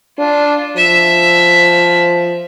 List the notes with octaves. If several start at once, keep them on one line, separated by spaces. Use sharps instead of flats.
D4 F4
F3 E5